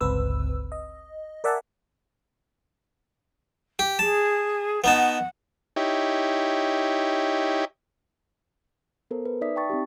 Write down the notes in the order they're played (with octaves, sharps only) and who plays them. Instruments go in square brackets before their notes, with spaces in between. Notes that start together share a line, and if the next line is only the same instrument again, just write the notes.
[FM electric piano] G1 C#2 C4 B4 E6
D#5
A#4 D5 E5 F#5 G#5 A5
[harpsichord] G4
[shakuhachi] G#4 [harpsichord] A5
[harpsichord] B3 D#4 A5 [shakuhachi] F#5
[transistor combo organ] D#4 E4 G4 C#5
[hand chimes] B3 A4 A#4 C5
B4
D#4 D5 E5 D#6 B6
G5 A5 C#6 A6
C4 D#4 G4